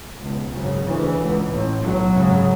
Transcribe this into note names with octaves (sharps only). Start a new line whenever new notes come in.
C#2 B2
G#1 F#2 C#3
D2 C#3 E3
C#2 B2
A1 A2
B1 A2 F#3
G#1 F#2 C#3